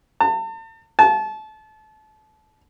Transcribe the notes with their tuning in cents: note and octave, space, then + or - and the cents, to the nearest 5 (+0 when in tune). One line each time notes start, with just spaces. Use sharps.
A5 +40
A5 -30